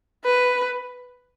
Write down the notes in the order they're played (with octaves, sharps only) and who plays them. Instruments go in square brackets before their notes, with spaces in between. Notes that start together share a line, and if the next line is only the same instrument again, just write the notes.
[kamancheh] B4